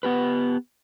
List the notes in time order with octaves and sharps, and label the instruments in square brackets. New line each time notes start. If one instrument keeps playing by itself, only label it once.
[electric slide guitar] B3 G4 B4